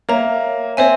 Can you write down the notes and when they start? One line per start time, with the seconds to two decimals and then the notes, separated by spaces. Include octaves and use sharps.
0.09 A#3 C#5 E5 A#5
0.77 C4 C#5 E5 G#5